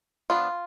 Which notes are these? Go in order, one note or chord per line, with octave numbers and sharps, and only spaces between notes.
F3 B3 D4 F4